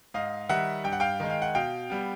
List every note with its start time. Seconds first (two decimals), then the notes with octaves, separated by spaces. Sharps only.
0.14 G#2 D#5 F5
0.49 D#3 G3 E5 F#5
0.84 G2 G5
0.93 F#5
1.00 F5 G5
1.20 D#3 G#3
1.30 F5
1.42 F#5
1.55 B2 F5 G5
1.90 G3 B3